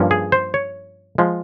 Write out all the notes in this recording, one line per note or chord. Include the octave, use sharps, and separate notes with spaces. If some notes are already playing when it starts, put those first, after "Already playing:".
Already playing: G2 F3 A#3 C#4
G#4
C5
C#5
F3 G#3